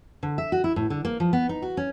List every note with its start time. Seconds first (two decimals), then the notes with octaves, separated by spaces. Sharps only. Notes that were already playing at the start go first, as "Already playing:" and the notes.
0.23 D3
0.38 E5
0.52 F#4
0.64 E4
0.76 A2
0.90 D3
1.05 A#3
1.20 F3
1.33 B3
1.49 D#4
1.62 F#4
1.77 C#4